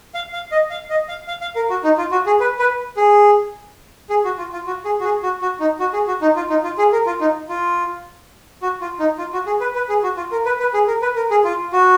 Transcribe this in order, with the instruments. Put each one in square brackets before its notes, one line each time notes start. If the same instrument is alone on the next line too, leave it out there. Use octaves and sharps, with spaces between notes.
[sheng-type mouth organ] F5
F5
D#5
F5
D#5
F5
F5
F5
A#4
F#4
D#4
F4
F#4
G#4
B4
B4
G#4
G#4
F#4
F4
F4
F#4
G#4
F#4
G#4
F#4
F#4
D#4
F#4
G#4
F#4
D#4
F4
D#4
F4
G#4
A#4
F4
D#4
F4
F#4
F4
D#4
F4
F#4
G#4
B4
B4
G#4
F#4
F4
A#4
B4
B4
G#4
A#4
B4
A#4
G#4
F4
F#4